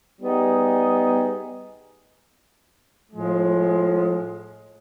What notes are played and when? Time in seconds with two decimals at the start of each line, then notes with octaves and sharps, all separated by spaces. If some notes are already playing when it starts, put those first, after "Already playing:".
0.21 G3 B3 D#4 G#4
3.12 A2 F3 G#3